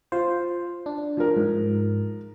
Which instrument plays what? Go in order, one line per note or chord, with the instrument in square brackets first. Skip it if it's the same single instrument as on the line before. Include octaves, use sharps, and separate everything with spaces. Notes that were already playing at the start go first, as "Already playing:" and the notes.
[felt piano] F4 [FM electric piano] C5
[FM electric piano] D4
[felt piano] F3 A#4
[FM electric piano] G#2